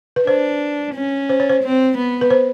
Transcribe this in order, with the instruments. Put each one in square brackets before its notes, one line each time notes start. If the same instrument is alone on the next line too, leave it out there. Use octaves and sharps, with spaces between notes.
[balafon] B4
[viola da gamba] D4 [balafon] C5
[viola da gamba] C#4
[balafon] C5
C#5
C5
[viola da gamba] C4
B3
[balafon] B4
C5